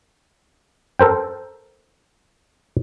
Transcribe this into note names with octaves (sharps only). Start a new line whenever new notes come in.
A4 A#4 C5 G5